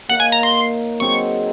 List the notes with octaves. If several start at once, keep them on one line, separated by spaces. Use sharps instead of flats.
A#3 D#4 A#4 C#5 F#5
G#5
A#5
C6
F#3 C4 D#4 G#4 C#6